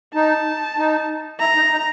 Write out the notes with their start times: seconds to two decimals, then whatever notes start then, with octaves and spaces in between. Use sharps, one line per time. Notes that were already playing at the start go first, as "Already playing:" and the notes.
0.15 D#4 A5
0.78 D#4
1.40 E4 A#5
1.56 D#4
1.72 D#4